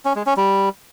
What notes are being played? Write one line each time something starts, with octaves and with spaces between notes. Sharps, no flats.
C#4
G#3
C#4
G3